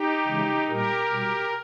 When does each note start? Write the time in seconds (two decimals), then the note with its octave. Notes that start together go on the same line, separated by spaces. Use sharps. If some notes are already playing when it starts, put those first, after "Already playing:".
Already playing: D#4 G4
0.27 C#3 E3 G#3
0.68 A#2 G3 G4 A#4
1.09 B2 G3